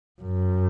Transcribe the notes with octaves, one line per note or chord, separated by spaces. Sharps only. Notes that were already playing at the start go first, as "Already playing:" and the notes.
F#2